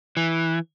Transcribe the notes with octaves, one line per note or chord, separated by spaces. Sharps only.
E3